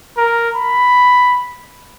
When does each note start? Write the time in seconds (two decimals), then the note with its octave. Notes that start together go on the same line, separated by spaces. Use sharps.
0.17 A#4
0.56 B5